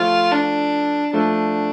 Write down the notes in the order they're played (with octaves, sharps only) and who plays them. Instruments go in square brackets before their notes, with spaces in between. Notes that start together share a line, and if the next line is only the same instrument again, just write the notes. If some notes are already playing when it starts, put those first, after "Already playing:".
Already playing: [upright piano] F3 A3 [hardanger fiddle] F4
[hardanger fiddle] D4
[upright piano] F3 A3 [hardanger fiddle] D4